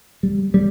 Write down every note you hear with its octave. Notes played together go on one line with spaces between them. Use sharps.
G3
G3